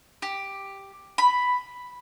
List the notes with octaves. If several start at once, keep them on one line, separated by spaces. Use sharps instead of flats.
G4
B5